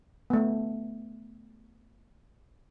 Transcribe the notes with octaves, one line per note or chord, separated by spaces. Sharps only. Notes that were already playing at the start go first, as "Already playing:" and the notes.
A3 B3